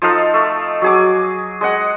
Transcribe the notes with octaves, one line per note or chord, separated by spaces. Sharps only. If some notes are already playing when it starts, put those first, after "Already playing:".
F3 D#4 A4 F5
A3
F#3 G#4 D6
G#3 D#5 F#5